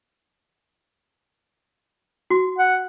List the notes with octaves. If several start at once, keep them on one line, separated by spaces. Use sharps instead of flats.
F#4
F#5